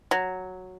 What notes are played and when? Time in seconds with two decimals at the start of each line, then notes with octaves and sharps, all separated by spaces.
0.11 F#3